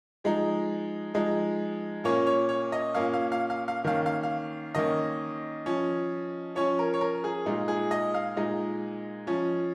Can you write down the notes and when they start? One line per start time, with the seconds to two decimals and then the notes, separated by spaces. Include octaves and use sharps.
0.24 F3 G#3 D#4
1.14 F3 G#3 D#4
2.04 A#2 A#3 C#4 C#5
2.27 C#5
2.49 C#5
2.72 D#5
2.94 A#2 A#3 C#4 F5
3.13 F5
3.32 F5
3.50 F5
3.68 F5
3.84 D#3 A#3 C#4 F5
4.06 F5
4.23 F5
4.75 D#3 A#3 C#4 D#5
5.66 F3 C#4
6.55 F3 C#4 C#5
6.79 A#4
6.94 C#5
7.01 A#4
7.24 G#4
7.46 A#2 G#3 D#4 F4
7.68 G#4
7.91 D#5
8.14 F5
8.36 A#2 G#3 D#4 D#5
9.27 F3 C#4